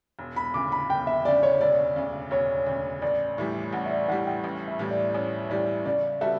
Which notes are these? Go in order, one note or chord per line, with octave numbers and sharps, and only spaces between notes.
E1
B5
D2 C#3 D6
B5
E1 G5
E5
D2 C#3 D5
C#5
E1 D5
D2 C#3
E1 C#5
D2 C#3
A1 D5
A2 E3 G3
A1 F#5
E5
D5
A2 E3 G3 F#5
G5
A1
E5
A2 E3 G3
D5
A1 C#5
A2 E3 G3 D5
C#3 D5
G3 B3 F#4 A4 E5